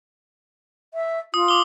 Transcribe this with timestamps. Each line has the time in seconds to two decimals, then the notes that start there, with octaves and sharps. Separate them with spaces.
0.94 E5
1.34 F4 D#6
1.48 D6 G7